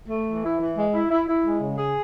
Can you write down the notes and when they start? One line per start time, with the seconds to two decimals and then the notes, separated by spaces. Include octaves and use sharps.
0.09 A3
0.27 E3
0.44 E4
0.60 E3
0.76 G#3
0.93 E4
1.11 E4
1.27 E4
1.45 G#3
1.60 C#3
1.78 G#4